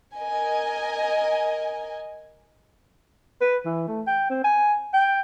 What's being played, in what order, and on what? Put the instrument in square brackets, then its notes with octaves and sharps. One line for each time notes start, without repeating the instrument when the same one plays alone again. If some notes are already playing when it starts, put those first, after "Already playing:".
[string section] A#4 D#5 G#5
[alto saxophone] B4
E3
A3
G5
C4
G#5
G5